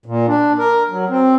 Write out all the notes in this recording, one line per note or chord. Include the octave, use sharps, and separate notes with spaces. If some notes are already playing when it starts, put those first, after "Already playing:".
A#2
D4
A#4
F#3
C4